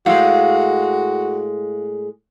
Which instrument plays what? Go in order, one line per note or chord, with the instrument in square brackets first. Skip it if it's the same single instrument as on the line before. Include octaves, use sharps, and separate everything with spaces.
[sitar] A2 G#3 [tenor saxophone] F#4 [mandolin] F5 G5 E6